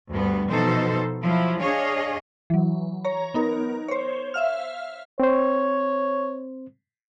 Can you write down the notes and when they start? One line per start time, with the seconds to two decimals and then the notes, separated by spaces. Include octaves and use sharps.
0.11 D2 G2 G3 B3
0.49 B2 E3 F3 D#4 A4 C5
1.23 F3 F#3 E4
1.60 D4 G#4 C#5 D#5 F5
2.50 E3 F#3
3.05 C#5 A#5
3.34 B3 D#4 A#4
3.88 C5 C#5
4.34 E5 F5 F6
5.20 C4 C5 C#5